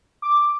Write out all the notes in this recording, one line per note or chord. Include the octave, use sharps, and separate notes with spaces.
D6